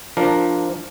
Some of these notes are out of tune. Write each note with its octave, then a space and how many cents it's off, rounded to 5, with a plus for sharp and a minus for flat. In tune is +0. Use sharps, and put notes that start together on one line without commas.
F3 +0 D4 +5 A#4 +0